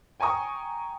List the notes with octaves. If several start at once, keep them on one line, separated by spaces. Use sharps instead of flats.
G5 G#5 A#5 C#6 D#6